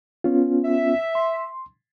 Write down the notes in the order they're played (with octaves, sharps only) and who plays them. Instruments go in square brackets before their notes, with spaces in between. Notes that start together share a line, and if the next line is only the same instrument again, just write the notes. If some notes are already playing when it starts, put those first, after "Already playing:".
[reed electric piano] B3 C#4 F4
[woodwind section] E5
[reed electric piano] C6